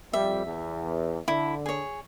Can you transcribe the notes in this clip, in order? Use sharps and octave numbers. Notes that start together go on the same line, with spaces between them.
F2 G3 E5
E2
D3 E4
G#4 C#5